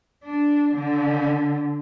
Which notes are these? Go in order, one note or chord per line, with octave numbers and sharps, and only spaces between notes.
D4
D3